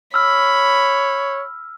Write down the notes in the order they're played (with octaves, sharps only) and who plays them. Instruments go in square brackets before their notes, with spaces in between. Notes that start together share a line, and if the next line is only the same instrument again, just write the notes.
[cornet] C#5 [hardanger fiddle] B5 [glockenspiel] E6 F6